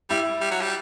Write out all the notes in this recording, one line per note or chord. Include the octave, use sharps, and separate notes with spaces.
G3 E4
G3
F#3
G3